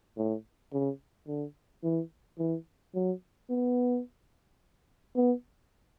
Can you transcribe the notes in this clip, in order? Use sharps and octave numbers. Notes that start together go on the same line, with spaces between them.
A2
C#3
D3
E3
E3
F#3
B3
B3